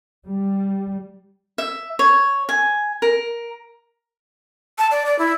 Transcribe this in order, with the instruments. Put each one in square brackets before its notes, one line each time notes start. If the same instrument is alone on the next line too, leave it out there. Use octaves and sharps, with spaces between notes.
[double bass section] G3
[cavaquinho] E5
C#5
G#5
A#4
[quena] A5
D5
D5
E4